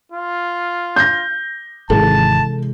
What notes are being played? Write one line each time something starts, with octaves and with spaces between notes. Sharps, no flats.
F4
G6 A#6
G#1 C3 E3 G#3 A4 A5